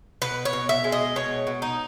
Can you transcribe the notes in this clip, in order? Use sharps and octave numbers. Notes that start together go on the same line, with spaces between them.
B2 B4
C#5
B2
E5
G#3
D#5
B2 C#5
B2
D#4